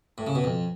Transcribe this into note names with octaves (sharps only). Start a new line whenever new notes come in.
A2
C#3
B2
F2